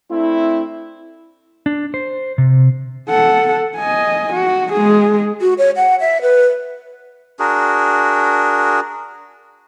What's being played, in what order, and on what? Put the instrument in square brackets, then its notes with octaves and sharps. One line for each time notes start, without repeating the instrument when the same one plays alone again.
[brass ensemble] A3 C4 D4 E4
[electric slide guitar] D4
C5
C3
[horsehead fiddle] A4 F#5
D#5 G#5
F#4
G#3 G#4
[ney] F#4
C#5
F#5
E5
B4
[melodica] D4 F#4 G#4 A#4